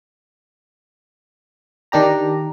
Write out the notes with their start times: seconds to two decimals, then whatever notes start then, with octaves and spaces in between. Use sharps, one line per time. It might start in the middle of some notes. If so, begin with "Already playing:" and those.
1.92 D#3 D4 G4 A#5